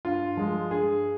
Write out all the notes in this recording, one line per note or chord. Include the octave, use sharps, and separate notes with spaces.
G2 F4
F3 G#3
G2 G#4